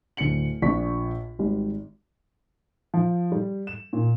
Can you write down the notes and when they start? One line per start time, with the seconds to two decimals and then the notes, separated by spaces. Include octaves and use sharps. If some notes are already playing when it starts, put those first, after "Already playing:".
0.17 D1 D4 C#7 F#7
0.62 A#1 A#2 D4 C#6 B6
1.39 G#1 G3
2.94 F3
3.32 G3
3.67 E7
3.93 A#2